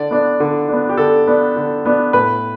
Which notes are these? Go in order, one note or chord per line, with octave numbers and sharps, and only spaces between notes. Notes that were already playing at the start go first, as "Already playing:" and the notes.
Already playing: D3 D5
B3 D4
D3
B3 D4
G4
D3 A4
B3 D4
D3
B3 D4
A2 B4